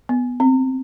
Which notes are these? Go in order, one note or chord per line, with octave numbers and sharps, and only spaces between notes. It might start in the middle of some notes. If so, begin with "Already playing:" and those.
B3
C4